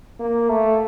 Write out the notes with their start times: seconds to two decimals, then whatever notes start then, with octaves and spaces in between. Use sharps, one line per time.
0.20 A#3
0.49 A3